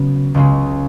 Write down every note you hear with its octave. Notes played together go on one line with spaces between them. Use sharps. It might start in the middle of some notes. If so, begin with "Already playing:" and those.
Already playing: C#3 F#3 B3
C#2 C#3 G#3